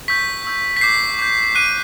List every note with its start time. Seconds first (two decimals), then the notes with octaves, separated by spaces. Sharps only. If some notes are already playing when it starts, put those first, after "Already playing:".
0.08 C#6 E6 G6 B6
0.45 C#6 E6 G6
0.77 B6
0.81 D6 G6 C7
1.19 D6 G6
1.55 D6 F#6 D#7